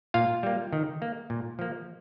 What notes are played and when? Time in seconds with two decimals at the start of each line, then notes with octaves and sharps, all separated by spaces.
0.14 A#2 F4 F5
0.43 G3 A#3
0.73 D#3
1.02 A#3
1.30 A#2
1.59 F3 A#3